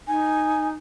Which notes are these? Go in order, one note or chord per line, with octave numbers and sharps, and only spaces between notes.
D#4 G#5